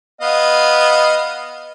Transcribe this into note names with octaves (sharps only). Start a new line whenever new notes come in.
B3 D#5 F5